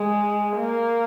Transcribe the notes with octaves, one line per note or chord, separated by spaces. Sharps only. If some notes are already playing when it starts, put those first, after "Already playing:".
Already playing: G#3
A#3